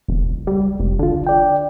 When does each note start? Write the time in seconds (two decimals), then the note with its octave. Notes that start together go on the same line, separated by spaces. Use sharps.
0.08 E1 C#2
0.47 G3
0.79 F1
0.99 C#2 D3 F4
1.27 D5 G5